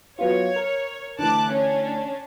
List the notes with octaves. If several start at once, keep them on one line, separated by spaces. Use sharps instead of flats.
F#3 B3 F4 C#5
A#4
D3 E3 A3 A5 D6 F#6
C#4 D4